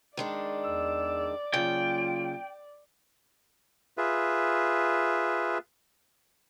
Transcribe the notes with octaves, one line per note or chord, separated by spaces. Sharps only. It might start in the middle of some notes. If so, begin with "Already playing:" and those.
D#3 G#3 D4 D5
E2 E6
C#3 F#3 A#3 F4 G5
F4 G#4 B4 E5